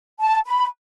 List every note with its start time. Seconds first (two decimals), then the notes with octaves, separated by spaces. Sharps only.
0.20 A5
0.46 B5